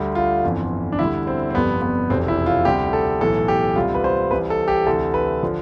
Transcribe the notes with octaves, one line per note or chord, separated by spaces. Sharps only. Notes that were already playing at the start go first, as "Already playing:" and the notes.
Already playing: D2 D3 G3
F4
G1 F2 E3
D4
D2 D3 G3 E4
C4
C4
G1 F2 C3 G3 B3
B3
F1 E2 B2 C4
E4
F4
D2 C3 G3 G4
A4
B1 A2 E3 A4
G4
D2 C3 G3 F4
B4
C5
C2 C3 E3 B4
A4
G4
D2 C3 E3 A4
B4
D3 F3